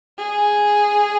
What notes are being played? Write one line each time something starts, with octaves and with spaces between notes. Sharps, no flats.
G#4